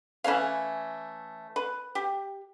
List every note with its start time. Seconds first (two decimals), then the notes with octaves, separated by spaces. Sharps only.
0.24 E3 A3 C#4 F5
1.56 B4
1.95 G4